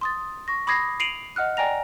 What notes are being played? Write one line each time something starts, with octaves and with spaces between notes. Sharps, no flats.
C6 D#6 A6
C#6 A#6
B5 D6 D#6 G#6 A#6 C7
C7 D7 D#7 F7 F#7
D#5 F#5 F6 F#6
D5 G5 G#5 A#5 A#6 F7